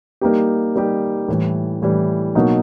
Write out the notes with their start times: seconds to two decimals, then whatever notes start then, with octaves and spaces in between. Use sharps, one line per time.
0.21 G3 A#3 D#4 G4
0.75 G3 A#3 D#4 G4
1.28 A2 E3 G3
1.82 A2 E3 G3
2.35 B2 F#3 A#3 D#4